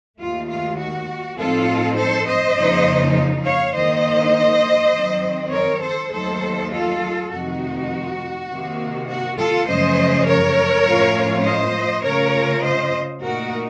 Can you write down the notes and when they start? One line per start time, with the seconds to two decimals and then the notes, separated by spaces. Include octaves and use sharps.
0.18 D#2 D#3 A3 F4
0.48 F4
0.78 F#4
1.37 A2 F3 C4 D#4 F4 A4
1.96 A4 C5
2.25 C5 D#5
2.56 F2 C#3 F3 A#3 D#4
3.44 C#5 F5
3.74 D#3 A#3 D#4 C5 D#5
4.92 D#3 F#3 C4
5.51 A#4 C#5
5.81 A4 C5
6.10 D#2 D#3 F#3 A3 D#4 A4 C5
6.70 F4 A4
7.29 F2 C3 D#3 A3 D#4 F#4
8.48 C3 D#3 A#3
9.07 F#4
9.36 F4 A4
9.66 F#2 C#3 F3 A3 C#4 C5 D#5
10.25 A#4 C#5
10.84 A2 F3 A3 C#4 F4
11.43 C5 D#5
12.03 C#3 A3 C#4 F4 A#4 C#5
12.62 C5 D#5
13.21 A#2 A3 D#4 F#4 A#4